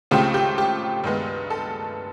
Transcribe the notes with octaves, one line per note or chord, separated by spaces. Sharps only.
C#2 C#3 F3 A3 C4 G4
G4
G4
G2 D#3 G#3 B3
A4